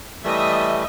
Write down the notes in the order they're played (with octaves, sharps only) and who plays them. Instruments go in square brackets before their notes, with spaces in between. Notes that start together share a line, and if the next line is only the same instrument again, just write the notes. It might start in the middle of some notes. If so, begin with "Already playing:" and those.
[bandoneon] E3 G3 A3 [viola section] D#5 E5